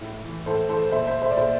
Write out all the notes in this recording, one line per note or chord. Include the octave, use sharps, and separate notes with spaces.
A2
E3
A2 A4 C5
E3 A4 C5
A#2 C5 E5
C5 E5
C5 E5
D5
A#2 C5 E5